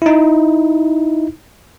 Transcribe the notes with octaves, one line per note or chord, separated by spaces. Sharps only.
D#4 E4